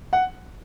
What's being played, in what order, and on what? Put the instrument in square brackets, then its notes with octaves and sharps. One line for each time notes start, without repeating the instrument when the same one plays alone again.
[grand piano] F#5